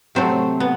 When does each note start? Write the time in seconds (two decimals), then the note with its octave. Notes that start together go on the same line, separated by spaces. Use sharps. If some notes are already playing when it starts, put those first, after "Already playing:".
0.15 C3 F#3 A3 C4
0.60 B3